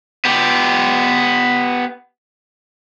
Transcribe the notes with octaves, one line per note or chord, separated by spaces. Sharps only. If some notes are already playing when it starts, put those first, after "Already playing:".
B3 G4